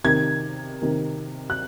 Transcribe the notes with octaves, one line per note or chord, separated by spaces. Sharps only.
C3 D#3 G#6
C3 D#3
F#6